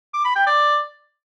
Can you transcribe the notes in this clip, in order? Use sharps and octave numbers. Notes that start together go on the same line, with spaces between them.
D6
B5
G5
D5